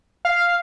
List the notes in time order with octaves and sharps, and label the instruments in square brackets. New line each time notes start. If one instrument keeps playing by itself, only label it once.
[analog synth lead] F5